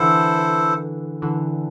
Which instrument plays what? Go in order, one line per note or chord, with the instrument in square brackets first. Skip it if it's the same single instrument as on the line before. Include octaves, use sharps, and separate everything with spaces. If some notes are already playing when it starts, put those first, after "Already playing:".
Already playing: [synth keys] D3 E3 [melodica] E4 A4 C5
[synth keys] D3 E3